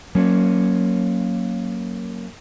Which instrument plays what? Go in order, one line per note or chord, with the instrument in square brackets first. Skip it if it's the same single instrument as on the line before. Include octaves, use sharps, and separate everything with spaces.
[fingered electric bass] F#3 [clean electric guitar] A#3 C#4